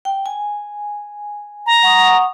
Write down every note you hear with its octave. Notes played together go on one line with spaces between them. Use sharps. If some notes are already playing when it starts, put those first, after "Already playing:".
G5
G#5
A#5
F#5 C#6 D#6